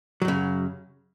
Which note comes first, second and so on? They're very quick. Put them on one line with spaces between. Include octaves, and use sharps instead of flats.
F#3 F#2 C#3